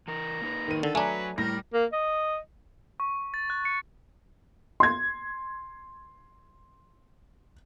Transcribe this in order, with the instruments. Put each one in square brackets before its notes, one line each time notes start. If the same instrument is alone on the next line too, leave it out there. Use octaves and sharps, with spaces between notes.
[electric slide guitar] E3 A#4 [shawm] A#5
[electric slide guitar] A#3 D#4 B4
[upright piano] D#3 D#7
[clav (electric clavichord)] D3 [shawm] A4
[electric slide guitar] F#3 [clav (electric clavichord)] A3 D4 [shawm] B4 [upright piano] G#5 A#5
[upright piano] A2 A#6 [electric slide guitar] G3 [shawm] A#4
[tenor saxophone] A#3
D#5
[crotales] C#6
A6
F#6
C#7
[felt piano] C6 G#6